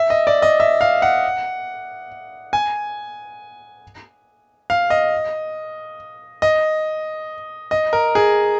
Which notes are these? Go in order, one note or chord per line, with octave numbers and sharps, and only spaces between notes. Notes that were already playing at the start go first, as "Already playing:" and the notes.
Already playing: E5
D#5
D5
D#5
E5
F5
F#5
G#5
F5
D#5
D#5
D#5
A#4
G#4